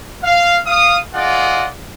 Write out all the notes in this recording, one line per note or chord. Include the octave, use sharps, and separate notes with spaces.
F5
F5 D#6
F4 G#4 D5 D#5 F#5